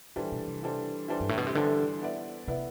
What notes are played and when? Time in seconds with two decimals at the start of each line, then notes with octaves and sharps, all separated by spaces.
0.16 A2 E3 G3 D4 A4 C5
0.32 B2
0.47 C3
0.63 E3 G3 D4 A4 C5
1.08 E3 G3 D4 A4 C5
1.20 G2
1.29 A2
1.38 B2
1.47 C3
1.55 D3 E3 G3 D4 A4 C5
2.01 B3 E4 B4 D5
2.48 C3 B3 E4 B4 D5